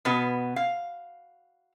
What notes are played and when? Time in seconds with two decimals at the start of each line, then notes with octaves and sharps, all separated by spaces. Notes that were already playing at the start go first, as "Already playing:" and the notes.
0.05 B2 B3 F#4
0.56 F5